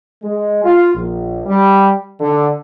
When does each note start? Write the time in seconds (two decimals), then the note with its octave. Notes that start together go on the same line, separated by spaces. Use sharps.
0.23 G#3
0.64 F4
0.95 A#1
1.46 G3
2.19 D3